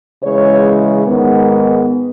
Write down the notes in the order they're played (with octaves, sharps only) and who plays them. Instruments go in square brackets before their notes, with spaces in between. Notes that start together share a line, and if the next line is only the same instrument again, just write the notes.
[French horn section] C#3 E3 G#3 C#5
G#2 D#3 G#3 B3